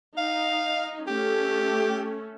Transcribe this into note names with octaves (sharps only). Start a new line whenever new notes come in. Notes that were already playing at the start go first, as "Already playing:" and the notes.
D#4 F5
A3 C#4 G4 A4